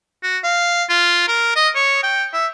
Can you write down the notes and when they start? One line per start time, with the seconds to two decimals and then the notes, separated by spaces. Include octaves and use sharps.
0.23 F#4
0.43 F5
0.89 F4
1.28 A#4
1.56 D#5
1.75 C#5
2.03 G5
2.33 E5